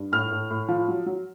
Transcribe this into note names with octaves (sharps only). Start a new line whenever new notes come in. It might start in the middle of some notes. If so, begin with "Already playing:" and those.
Already playing: G2
A2 F6
A2
A2
F3
F#3
F#3